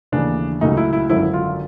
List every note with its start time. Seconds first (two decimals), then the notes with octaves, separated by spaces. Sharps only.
0.12 D#2 C#3 E3 A3 D4
0.61 C#2 C#3 F#3 A3 D#4
0.77 E4
0.93 E4
1.09 G#1 F#2 D3 F3 E4
1.34 F4